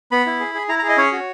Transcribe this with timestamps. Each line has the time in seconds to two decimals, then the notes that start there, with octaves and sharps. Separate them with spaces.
0.11 B3 B5
0.26 E4
0.40 G#4
0.54 G#4
0.68 E4 A#5
0.79 A#5
0.83 G#4
0.88 D#5
0.97 C#4 C#5
1.12 F#4